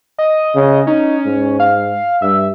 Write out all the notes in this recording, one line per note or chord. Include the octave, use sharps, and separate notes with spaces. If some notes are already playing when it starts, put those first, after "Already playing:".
D#5
C#3
C#4 D#4
G#2
F5
G2 E5